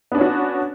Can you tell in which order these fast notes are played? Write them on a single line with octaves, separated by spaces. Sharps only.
B3 D4 C#4 F#4